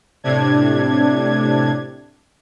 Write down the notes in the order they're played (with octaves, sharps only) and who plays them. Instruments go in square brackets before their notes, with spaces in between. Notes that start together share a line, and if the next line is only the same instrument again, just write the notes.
[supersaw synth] A2 C3 D4 G#6